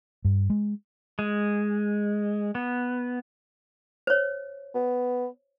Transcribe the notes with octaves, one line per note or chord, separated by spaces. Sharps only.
G2
G#3
G#3
B3
C5 C#5
B3